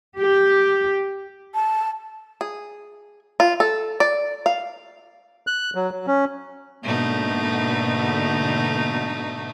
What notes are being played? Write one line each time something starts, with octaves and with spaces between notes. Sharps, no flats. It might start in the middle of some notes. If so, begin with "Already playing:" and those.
G4
A5
G#4
F4
A4
D5
F5
F#6
F#3
F#3
C#4
G#2 B2 D3 A3 A#3 D#4